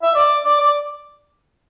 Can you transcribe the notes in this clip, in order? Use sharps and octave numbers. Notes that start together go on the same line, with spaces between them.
E5
D5
D5
D5